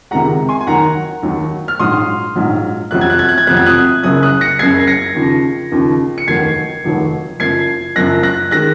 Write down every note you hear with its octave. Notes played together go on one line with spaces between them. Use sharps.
C#2 C3 D#3 G#3 F#5 A#5
G#5 C6
G#5
D#2 D#3 F#3 F#5 A#5
D#2 D#3 F#3
F6
A#1 G#2 F#3 C6 D#6
A#1 G#2 F#3
F2 C3 F#3 F#6
G#6
F#6
G#6
F#6
G#6
F2 C3 F#3 F#6
G#6
D#6 F#6
F#1 F#2 C#3 D#6 F#6
D#6 F#6
A#6 C#7
F#1 F#2 C#3 G#6 C7
A#6 C#7
D#2 C#3 F3
D#2 C#3 F3
C#7
F1 D#2 D#3 F#3 G#6 C7
F1 D#2 D#3 F#3
F#1 F#2 F3 G#6 C7
F#1 F#2 F3 F#6 A#6
F#6 A#6
D#3 G#3 F#6 A#6